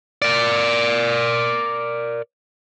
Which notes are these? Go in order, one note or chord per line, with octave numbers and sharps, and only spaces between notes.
A#4 D5